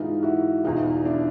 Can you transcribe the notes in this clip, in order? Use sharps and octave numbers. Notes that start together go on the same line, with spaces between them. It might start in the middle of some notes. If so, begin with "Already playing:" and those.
Already playing: G#2 E3 D#4 F4
E4 F#4
E2 B2 D#4 F4
D4 E4